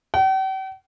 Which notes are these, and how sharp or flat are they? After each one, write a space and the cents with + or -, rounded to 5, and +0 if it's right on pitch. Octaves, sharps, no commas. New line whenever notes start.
G5 -45